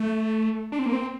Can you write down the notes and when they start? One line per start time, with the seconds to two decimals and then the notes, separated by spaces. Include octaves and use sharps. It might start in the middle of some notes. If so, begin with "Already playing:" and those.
Already playing: A3
0.72 D4
0.79 C4
0.86 A#3
0.93 C4